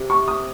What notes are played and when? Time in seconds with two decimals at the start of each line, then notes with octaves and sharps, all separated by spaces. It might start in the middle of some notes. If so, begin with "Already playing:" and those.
Already playing: C3
0.10 C#6
0.28 D#6